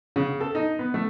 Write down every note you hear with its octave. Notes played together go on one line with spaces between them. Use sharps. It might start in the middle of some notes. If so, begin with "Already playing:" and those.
C#3
A4
D#4
B3
A3